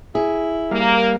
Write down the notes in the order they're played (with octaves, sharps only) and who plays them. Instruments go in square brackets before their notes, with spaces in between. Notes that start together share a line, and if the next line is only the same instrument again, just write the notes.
[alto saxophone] E4 [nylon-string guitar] G#4
[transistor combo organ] G3 A#4 F5 [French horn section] A#3